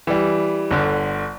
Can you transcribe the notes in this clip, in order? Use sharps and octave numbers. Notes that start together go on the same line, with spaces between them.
E3 G3
G1 D3